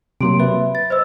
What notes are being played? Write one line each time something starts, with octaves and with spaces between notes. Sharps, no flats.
C3 F#3 A#3 C6 D7
B4 E5
A6
C5 D#5 E6